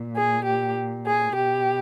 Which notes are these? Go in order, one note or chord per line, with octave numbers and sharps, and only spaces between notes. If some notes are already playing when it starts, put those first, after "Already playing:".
Already playing: A#2
G#4
G4
G#4
B2 G4